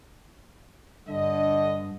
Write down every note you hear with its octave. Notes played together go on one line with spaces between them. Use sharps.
G2 D3 D#5